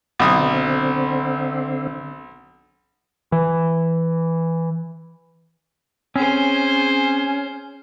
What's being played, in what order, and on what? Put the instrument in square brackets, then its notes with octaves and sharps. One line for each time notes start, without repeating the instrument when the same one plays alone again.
[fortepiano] B1 D#6 [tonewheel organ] D3 C4
[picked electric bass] E3
[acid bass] C4 [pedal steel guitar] C#4 [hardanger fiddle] G#4 C5